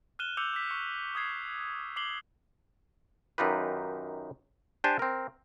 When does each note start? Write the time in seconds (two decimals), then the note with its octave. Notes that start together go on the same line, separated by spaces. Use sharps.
0.19 F6 F#6 D#7 E7 G7
0.37 D6 E6 G6 C#7 F7
0.53 D6 B6
0.70 C#6 C#7
1.15 D#6 G6 G#6 C7
1.96 D6 C7 F#7 G7
3.38 F#2 D#3 D#4 F4 G4 B4
4.84 D4 G4 C5 D5 G#5 A5
4.99 C4 A#4